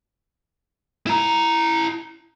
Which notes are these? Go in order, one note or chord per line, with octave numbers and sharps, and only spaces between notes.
E4 A#5